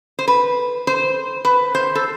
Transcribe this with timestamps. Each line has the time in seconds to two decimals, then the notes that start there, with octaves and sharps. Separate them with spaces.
0.19 C5
0.28 B4
0.87 C5
1.45 B4
1.75 C5
1.95 A4